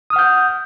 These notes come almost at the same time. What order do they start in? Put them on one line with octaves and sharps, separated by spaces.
D#6 F6 F#5 G6